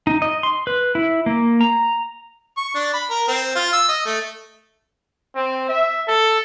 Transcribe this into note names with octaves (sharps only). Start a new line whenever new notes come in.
D#4
D#5
C6
B4
E4
A#3
A#5
C#6
D4
B5
A#4
C4
F4
E6
D#5
A3
C4
E5
A4